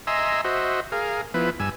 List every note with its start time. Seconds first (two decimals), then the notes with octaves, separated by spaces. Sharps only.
0.07 D#5 E5 G#5 A#5 C6 E6
0.44 F#4 C5 D#5 E5
0.92 G#4 A#4 F5
1.34 F3 B3 E4 B4
1.60 G2 G#5 E6